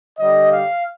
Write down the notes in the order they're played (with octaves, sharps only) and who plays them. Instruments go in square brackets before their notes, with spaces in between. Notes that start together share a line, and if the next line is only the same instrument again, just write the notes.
[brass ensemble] D3 G3 D#5
F5